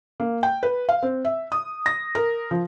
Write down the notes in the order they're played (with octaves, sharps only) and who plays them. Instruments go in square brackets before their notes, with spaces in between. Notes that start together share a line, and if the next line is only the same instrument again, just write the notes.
[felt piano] A#3
G5
B4
F5
C4
E5
D#6
A#6
A#4
F3